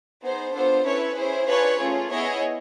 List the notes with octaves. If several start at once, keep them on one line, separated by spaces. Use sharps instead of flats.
B3 D#4 G#4 C5
B3 D4 F4 A4 C5
C#4 E4 A4 B4 C#5
C#4 E4 G#4 C5
D4 F4 G#4 B4 C#5
A3 C#4 F4 G#4
B3 E4 G#4 C#5 D#5